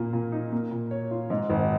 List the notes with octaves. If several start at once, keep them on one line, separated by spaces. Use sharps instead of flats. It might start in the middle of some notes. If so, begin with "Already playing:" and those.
Already playing: A#2 A#3
A#2
D#4
A#3
A#2
C#5
F4
G#2
G#1